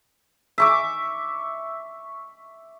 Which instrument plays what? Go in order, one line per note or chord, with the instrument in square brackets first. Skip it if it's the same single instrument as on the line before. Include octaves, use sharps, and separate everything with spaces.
[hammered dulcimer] E5 C#6 D6